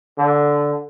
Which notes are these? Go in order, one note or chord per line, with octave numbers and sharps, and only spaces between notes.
D3